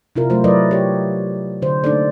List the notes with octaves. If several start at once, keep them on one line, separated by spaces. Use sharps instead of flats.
C3 E4 F4 A#4
F#3 G3 A3 F4 C5
F#3 E4 A#4 B4 D5 D#5
G4 C#5
D3 C5
A3 A#3 D4 D#4 A4 D5